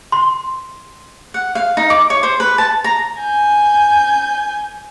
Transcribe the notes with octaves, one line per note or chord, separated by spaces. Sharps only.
C6
F#5
F5
D#4
D6
C#5
C5
B4
A5
A#5
G#5 G6